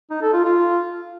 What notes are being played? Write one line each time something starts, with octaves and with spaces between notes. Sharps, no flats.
D#4
A4
F4
F4